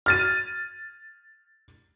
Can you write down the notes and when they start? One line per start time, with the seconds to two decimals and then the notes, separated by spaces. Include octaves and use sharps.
0.06 F6 A6 D#7